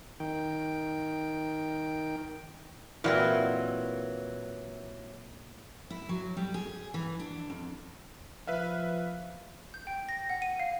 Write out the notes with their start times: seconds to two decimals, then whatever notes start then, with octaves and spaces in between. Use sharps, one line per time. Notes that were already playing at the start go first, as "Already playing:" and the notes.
0.20 D#3 G5
3.04 A#2 E3 F#3 C4 B4
5.90 E4
6.09 F#3
6.37 G3
6.54 G#4
6.94 E3
7.19 D4
7.50 F2
8.47 F3 B4 E5 F5
9.74 G6
9.87 G5
10.09 A#6
10.30 F#5
10.42 D#7
10.60 F5